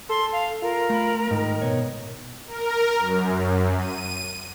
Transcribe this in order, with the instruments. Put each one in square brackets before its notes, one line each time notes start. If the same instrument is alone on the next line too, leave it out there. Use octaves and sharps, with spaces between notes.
[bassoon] A4 [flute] C6
[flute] F5
[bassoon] F4 [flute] A#4
[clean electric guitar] A3 A#5 B5
[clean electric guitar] G#2 [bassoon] D#3
[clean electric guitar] B2 B3 C#5
[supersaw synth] A#4
F#2
D#7